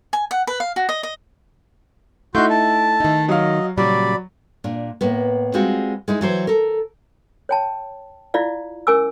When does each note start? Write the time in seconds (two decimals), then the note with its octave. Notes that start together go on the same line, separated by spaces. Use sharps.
0.13 G#5
0.31 F#5
0.47 B4
0.60 F5
0.76 F#4
0.89 D#5
1.03 D#5
2.35 A3 D#4 E4 F#4 C6 G6
2.50 A5
3.00 D#3 D#4
3.29 F#3 D#5 F5
3.78 A#2 C#3 F#3 G3 D5 B5
4.64 A#2 D4
5.01 A2 A#3 B3
5.53 G3 G#3 C4 F4 F#4
6.08 G#3 D#4 E4
6.21 E3 F#3 C5
6.47 A4 A#4
7.49 C#5 G5 A5
8.34 E4 F4 D5 F5
8.87 C#4 A#4 G#5 D6 E6